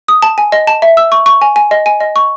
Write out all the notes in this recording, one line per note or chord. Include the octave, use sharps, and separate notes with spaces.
D#6
A5
G#5
D#5
A5
E5
E6
C#6
C#6
G#5
G#5
D#5
G#5
D#5
C#6